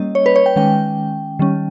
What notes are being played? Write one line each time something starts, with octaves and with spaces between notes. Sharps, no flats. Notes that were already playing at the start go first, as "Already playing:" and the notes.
Already playing: G3 A#3 C#4 D#5
C#5
B4
C#5
G5
D#3 G#3 C#4 G5
D#3 G3 C#4